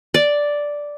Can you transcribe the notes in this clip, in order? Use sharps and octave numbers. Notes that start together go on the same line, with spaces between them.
D5